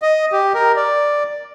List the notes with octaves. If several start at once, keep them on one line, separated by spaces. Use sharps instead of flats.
D#5
G4
A#4
D5